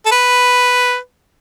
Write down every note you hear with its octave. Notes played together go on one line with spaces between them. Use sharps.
A4
B4